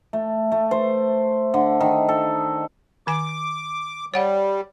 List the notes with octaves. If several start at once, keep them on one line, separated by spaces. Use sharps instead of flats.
A3
A3
C5
D3
D#3
A4
D#3 G#5 D6
G3 C#5 F#5 G5